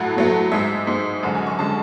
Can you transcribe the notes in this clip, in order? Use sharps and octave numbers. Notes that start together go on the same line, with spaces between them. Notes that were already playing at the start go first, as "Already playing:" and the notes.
Already playing: A2 F#3 A3 F#5
A2 F#3 A3
G#2 G#3 E5
G#2 G#3
F#2 D3 G#3 F#5
G#5
C#6
D3 G#3 A5